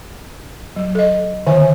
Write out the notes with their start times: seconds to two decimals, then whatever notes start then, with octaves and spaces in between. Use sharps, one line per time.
0.76 F#3
0.95 A4 D#5
1.47 D3 D#3 E5 G#5